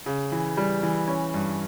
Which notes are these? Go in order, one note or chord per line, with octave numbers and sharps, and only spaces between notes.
C#3
E3
G3
E3
C#4
G2